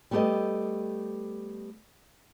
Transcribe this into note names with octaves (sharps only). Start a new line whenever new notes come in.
G3 A3 B3 G4 A4 D#5